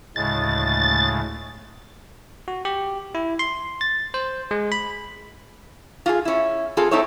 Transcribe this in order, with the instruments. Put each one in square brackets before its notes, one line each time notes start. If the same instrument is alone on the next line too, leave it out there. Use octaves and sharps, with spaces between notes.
[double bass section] D2 [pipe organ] A2 C#3 G#3 [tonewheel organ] A6
[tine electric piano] F#4
G4
E4
C6
A6
C5
G#3
B5
[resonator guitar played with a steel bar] F4 F#4 G#4
C#4 E4
C4 F4 G#4 A4
A3 C4 D#4 E4 C#5